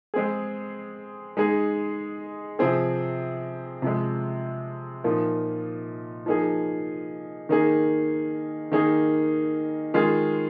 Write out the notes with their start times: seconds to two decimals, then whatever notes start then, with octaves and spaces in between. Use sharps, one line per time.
0.14 G#3 C4 G#4
1.37 G#3 D#4 G#4
2.59 C3 F3 C4 G#4
3.82 C3 F3 G#3
5.04 A#2 F3 A#3 D#4
6.26 F3 A#3 D#4 G#4
7.49 D#3 A#3 D#4 G#4
8.72 D#3 A#3 D#4 G#4
9.94 D#3 G#3 F4 G#4